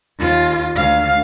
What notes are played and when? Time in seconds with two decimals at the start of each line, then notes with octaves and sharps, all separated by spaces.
0.20 D#2 F4
0.75 D2 F5